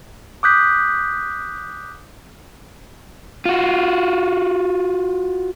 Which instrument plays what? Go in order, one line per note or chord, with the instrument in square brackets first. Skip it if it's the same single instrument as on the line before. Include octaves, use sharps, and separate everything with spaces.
[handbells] D6 D#6 F#6 G6 B6
[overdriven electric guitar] F4 F#4